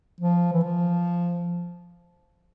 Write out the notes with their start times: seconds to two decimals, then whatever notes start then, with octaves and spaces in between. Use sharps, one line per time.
0.20 F3
0.53 E3
0.64 F3